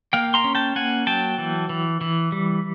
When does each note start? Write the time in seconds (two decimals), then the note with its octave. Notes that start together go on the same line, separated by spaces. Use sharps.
0.13 A#3 F5 G5
0.34 A#5 C6
0.44 C#4
0.55 G5 A5
0.76 A#3 F#5 G#5
1.07 F#3 G5 A5
1.38 E3
1.69 E3
2.01 E3
2.32 G3